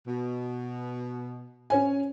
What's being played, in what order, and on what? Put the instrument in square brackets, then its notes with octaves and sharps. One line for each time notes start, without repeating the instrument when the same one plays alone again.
[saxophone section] B2
[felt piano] C#4 C#5 G#5